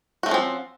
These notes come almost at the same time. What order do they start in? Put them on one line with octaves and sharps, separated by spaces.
F#4 A3 C#4 F3 C4